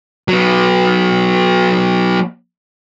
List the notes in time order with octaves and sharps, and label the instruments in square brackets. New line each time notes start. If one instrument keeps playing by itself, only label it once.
[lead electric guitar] F#3 B3